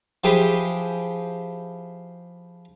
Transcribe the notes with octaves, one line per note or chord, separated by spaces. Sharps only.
F3 E4 G4 G#4 B4